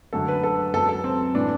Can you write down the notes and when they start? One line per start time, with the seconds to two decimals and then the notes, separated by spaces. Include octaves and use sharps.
0.13 F#2 D3 A3 A4
0.28 B4
0.43 A4
0.73 F#2 F#3 B3 A4
0.89 A4
1.04 C4
1.34 A2 E3 B3 D4